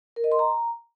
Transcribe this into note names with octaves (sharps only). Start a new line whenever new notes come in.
A#4
D#5
C6
A#5